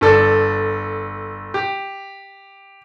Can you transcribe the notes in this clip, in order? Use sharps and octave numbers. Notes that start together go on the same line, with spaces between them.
G1 A4 D5
G4